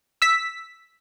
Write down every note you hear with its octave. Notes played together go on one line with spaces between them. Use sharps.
E6 B6